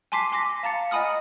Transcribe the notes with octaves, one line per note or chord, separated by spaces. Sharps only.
G#5 A5 C6 D6 B6 C7
G#5 C6 D6 A#6 B6
F5 A5 A#5 A6 C#7
D#5 F#5 G#5 B5 D#6 F6